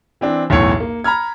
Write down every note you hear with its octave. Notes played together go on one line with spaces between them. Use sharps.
E3 C4 D4
B1 E2 A2 C#5 C#7
A#3
A#5 B5 F6 G#6